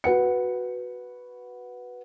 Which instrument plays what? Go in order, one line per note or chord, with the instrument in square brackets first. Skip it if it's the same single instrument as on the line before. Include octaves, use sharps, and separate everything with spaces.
[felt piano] F#4 B4 F#5 C#7